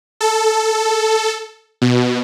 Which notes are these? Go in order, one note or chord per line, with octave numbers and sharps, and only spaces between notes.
A4
B2